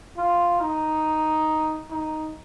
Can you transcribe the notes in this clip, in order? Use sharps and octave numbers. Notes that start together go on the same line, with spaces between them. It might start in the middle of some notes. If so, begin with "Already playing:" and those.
F4
D#4
D#4